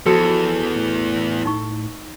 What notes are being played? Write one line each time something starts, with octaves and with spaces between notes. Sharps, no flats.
E2 F3 F#4 A4
A2
D#4 C#6